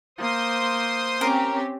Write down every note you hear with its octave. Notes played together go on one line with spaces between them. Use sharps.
A#3 C5 C6 D#6
C4 C#4 G4 A#4